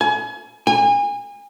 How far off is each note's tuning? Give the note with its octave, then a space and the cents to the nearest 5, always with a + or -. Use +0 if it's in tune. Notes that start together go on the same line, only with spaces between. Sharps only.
G#5 +35
G#5 -35